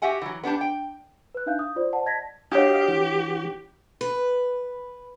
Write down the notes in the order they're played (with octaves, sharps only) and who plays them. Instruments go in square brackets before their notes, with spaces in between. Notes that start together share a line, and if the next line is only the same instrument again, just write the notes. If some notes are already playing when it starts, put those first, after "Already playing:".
[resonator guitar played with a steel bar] F#4 G4 E5 F#5 G#5
E3 F#3
B3 D4 G4 A5
G5
[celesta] B4 F#6
D4 D#4 E5 F5 F#6 G6
D#6
F4 C5 D5
C5 D5 F#5 A5
D#5 A5 G#6 A#6 B6
[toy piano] D4 C#5 [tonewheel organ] F#4 D#5 F5 [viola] G4
[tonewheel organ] E3 F#4
[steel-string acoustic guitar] B4